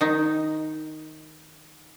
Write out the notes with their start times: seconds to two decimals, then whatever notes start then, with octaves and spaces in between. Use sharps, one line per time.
0.01 D#3 D#4